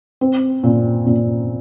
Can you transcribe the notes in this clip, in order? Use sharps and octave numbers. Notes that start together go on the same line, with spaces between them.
C4
A#2
A#2